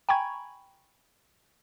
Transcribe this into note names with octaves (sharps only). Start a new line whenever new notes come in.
G5 G#5 A#5 B5 C#6 G#6